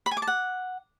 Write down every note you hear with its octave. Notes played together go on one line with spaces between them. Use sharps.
B5
G#5
D6
A5
F#5